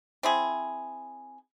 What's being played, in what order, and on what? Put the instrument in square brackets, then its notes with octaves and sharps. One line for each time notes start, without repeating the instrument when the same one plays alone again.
[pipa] C4 E4 G#4